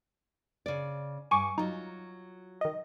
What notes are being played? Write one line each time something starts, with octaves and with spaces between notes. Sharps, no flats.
C#3 D5
G2 G#5 C#6 D6
F#3 D#4 F4
D#3 D#5